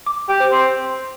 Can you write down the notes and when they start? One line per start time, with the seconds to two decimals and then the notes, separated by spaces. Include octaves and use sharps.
0.06 D6
0.29 G4
0.40 C5
0.51 C4